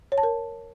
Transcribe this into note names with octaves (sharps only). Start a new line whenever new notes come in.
C#5
A5
A#4